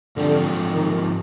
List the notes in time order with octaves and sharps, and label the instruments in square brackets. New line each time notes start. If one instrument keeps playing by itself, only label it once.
[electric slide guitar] G#2 F3 C4 G4 [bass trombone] D3
[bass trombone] D#3